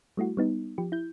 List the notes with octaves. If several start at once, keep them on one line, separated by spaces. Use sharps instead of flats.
G3 A3 E4 F#4
G3 B3 D#4
F3 G4
E4 G6